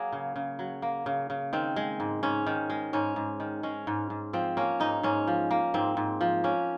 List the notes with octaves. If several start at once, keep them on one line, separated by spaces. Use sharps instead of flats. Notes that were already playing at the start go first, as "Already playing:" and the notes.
Already playing: F#3 A#3 G#4
C#3
C#3
F#3
A#3
C#3
C#3
D#3 C4
G#3
G#2
G#2 C#4
D#3
G#3
G#2 C#4
G#2
D#3
G#3 C#4
G#2
G#2
F3 C4
A#3 C#4
G#2 D#4
G#2 C#4
F3
A#3
G#2 C4
G#2
F3
A#3 C#4